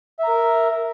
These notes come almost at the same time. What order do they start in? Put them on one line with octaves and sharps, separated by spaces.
E5 A#5 A#4